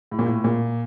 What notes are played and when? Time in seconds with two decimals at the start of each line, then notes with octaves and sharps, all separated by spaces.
0.11 A2
0.19 A#2
0.26 A2
0.44 A#2